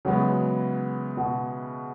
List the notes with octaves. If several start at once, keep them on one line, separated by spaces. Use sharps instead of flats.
C#3 E3 F#3 G#3 B3
B2